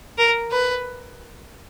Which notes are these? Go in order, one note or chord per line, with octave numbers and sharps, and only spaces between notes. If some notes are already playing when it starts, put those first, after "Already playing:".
A#4
B4